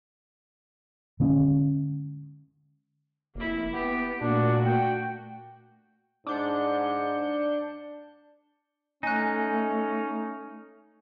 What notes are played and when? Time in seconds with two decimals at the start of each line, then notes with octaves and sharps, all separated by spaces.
1.20 D3 G#3 C#4
3.35 F1 A#3 E4
3.73 B3 G4
4.21 A#2 A3 D4 F#4
4.65 G5
6.27 G#2 D4 G6 C#7
9.03 A3 C#4 D#4 G#5 F#6